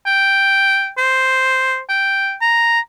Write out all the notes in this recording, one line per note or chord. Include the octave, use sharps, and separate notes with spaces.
G5
C5
G5
A#5